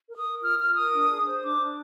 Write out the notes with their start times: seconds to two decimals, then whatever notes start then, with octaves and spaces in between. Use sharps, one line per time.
0.08 A#4
0.16 D#6
0.25 A#4
0.42 F4 F6
0.59 F4 F6
0.76 A#4 D#6
0.93 D4
1.09 G#4
1.26 C5
1.43 D4 D6
1.60 D4